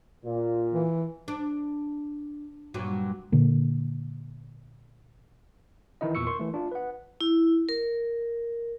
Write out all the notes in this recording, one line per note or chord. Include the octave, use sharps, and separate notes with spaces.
A#2
E3
D4
G2 A#2 F#3
A#2 D3 A#3
D#3 E3 D#4 E4 D#5
E2 A#2 C#6 E6 C#7
A#4 C6 C#6
E3 A3
D4 F4
B4 F#5
E4
A#4